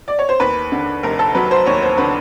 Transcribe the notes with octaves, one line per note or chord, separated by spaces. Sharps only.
D5
C#5
C5
D#2 B4
D3
F1 A#4
A4
F#3 B4
C5
D#2 C#5
C5
D3 B4